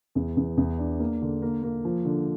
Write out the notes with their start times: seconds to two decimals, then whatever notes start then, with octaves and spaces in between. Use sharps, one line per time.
0.15 E2
0.37 E2
0.57 E2
0.79 D4
1.00 A#3
1.22 D3
1.42 A#3
1.63 A#3
1.85 F3
2.05 D3